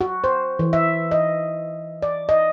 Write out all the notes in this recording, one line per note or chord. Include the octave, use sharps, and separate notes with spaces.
F#4
C5
E3
E5
D#5
D5
D#5